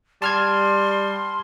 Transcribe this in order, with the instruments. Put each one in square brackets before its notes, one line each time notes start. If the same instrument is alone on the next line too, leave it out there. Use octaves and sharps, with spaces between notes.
[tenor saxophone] G3 [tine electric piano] A5 F6 G#6 [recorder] C6